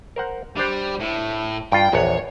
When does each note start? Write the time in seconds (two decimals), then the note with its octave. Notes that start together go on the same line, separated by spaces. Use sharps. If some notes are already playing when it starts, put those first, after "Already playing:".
0.16 A#4 C5 F#5
0.57 G3 D4 C5
1.00 A2
1.72 G2 F4 G5
1.93 A#1 E2 C#5 F#5